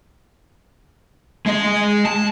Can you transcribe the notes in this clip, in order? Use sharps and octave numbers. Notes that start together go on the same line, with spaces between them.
G#3 D#5
A5